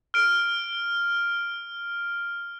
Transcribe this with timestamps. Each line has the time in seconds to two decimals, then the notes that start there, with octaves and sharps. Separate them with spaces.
0.14 F6 D7